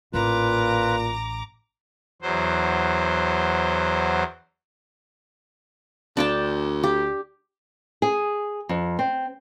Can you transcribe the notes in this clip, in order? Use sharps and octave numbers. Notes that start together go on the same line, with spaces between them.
A1 A#2 F4 B4 A#5 D6
E2 F#3 C5
D2 D4 G5 A5
G4
G#4
F2
C4